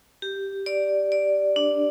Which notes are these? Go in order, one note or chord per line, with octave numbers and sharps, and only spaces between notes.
G4
D5
D5
D4